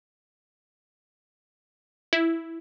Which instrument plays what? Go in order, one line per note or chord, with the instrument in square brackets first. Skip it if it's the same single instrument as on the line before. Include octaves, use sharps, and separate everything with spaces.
[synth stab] E4